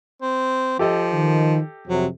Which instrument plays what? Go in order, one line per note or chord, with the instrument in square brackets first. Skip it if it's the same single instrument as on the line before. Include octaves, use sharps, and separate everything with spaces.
[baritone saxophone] C4
[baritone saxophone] F3 [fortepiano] G4 A4 D#5
[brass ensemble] D#3
[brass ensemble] F2 C3 [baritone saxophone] F#3